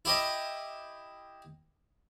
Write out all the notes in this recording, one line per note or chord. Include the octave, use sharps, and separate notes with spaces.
E4 G4 D#5